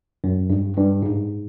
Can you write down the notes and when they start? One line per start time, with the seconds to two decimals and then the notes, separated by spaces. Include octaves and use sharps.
0.24 F#2
0.50 G2
0.77 G2
1.02 G#2